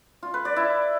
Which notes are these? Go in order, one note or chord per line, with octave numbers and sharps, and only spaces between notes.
F4
B4
D5
E4